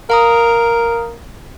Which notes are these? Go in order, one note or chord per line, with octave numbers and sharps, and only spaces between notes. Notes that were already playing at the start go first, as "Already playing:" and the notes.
A#4 F5 A#5 D#6